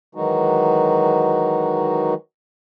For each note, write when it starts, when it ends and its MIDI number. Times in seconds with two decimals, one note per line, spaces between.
0.15 2.14 51
0.15 2.14 52
0.15 2.14 54
0.15 2.14 56
0.15 2.14 63
0.15 2.14 66